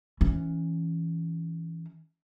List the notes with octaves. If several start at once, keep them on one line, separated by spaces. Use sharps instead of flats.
E3 C#4